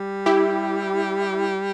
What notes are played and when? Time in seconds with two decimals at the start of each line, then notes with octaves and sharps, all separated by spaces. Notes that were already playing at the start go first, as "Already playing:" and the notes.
Already playing: G3
0.26 E4 G4